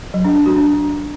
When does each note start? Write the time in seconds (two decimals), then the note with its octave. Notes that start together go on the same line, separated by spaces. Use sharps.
0.14 F#3
0.25 D4
0.35 D4
0.46 F#4
0.56 D4